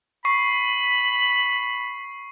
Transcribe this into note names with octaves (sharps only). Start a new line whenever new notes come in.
B5 C#6 C7